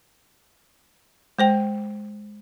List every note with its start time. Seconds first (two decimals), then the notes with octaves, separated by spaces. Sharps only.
1.39 G#3 C5 G5